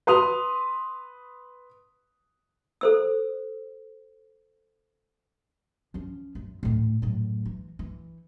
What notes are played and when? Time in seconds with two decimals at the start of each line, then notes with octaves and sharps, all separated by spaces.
0.07 B4 C6 D#6 F7
2.81 A4 C5 E6
5.94 F3 C#4
6.35 F#2
6.63 D2 A2
7.02 F#2 A2
7.45 E3
7.79 E3